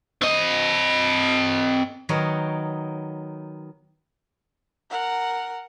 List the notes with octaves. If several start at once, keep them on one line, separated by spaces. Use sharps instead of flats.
C4 D#5
D#3 F#3 B3 D#4 C#5
A#4 F#5